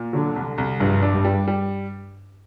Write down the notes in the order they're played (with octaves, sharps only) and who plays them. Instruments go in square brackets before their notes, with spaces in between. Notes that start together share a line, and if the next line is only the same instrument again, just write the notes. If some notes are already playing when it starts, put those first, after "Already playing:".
Already playing: [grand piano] A#2
[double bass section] D3 [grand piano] F#3
[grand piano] C2
C2
[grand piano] A#1 [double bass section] G2
[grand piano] D4
[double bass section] G2
[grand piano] G3
G3